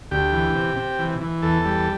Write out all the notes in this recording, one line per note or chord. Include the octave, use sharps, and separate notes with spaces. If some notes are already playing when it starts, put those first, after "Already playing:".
D2 G4
E3
C3
C3
E3
E3
E2 A4
G3